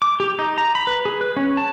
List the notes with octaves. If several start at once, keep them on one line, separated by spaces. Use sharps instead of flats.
D6
G4
D#4
A#5
B5
B4
G#4
B4
C#4
A5